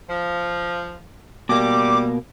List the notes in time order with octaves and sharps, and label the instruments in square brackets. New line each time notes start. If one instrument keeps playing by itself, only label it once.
[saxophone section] F3
[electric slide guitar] B2 A#3 [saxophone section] G3 [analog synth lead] D6